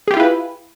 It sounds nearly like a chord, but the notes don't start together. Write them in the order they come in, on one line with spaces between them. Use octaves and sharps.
G#4 G4 F4 E4 B4